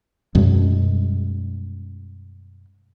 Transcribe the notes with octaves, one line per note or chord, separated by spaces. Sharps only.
F#2 B2 G3 G#3